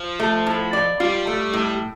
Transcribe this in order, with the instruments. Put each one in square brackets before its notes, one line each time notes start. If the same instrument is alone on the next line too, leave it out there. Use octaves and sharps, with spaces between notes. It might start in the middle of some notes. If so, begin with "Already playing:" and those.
Already playing: [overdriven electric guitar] F3
[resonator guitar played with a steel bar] A3
A2
D5
[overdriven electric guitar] G3 [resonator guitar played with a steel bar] F4
[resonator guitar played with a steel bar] A3
A2